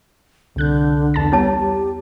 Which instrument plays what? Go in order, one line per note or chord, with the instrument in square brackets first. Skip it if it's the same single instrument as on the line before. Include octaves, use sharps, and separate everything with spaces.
[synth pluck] C2 F#6 G6 [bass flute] D3
[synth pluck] E2 A5 A6
[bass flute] G3 [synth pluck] B3 [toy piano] E4 C#5 A5
[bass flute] G4